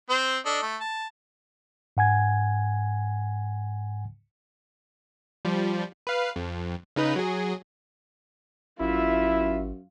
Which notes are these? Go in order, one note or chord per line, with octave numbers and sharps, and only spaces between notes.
C4 C5
D4 A4 D#5
A3
A5
G#2 F#5 G#5 G#6
F3 G3
B4 F5
F2
C#3 D#4 B4
F#3 G#4
G#1 F#2 E4 F4 E5